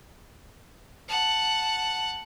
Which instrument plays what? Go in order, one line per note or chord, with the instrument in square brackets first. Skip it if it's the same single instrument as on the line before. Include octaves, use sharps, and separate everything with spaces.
[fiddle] F#5 A5